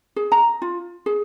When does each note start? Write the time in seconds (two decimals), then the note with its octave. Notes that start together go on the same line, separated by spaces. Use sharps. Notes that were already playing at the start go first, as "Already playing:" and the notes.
0.16 G#4
0.32 A#5
0.62 F4
1.06 G#4